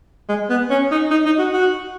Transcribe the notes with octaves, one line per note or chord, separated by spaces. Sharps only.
G#3
B3
C#4
D#4
D#4
D#4
F#4
F#4